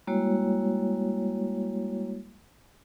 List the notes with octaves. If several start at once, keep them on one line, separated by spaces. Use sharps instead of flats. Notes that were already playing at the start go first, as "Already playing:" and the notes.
G3 G#3 A#3 E4 F#4 C#5